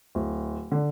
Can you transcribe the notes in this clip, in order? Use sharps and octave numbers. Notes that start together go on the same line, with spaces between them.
D1
D3